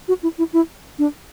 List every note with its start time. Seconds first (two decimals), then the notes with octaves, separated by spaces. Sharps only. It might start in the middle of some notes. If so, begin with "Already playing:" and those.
0.08 F#4
0.23 E4
0.38 E4
0.53 E4
0.99 D4